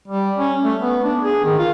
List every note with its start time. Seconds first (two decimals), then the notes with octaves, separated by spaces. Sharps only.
0.08 G3
0.37 C#4
0.64 A3
0.82 B3
1.04 D4
1.22 G#4
1.44 D#3
1.58 F4